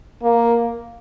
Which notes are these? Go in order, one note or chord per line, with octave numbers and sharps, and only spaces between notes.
A#3